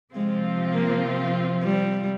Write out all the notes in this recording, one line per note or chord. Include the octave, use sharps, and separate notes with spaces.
C3 F3 G#3 C4 F4
A#3
G3